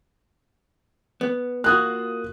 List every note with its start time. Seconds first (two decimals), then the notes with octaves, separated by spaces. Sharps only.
1.21 B3
1.64 A#3 F4 F#4 D#6 F#6